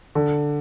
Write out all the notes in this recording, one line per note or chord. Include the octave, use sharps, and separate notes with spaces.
D3